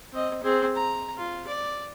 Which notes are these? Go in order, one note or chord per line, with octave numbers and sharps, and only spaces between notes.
C4 D#5
C4 G#4
A#5
F4
D5